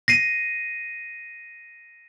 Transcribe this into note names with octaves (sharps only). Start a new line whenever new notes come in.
A#6 C7 D#7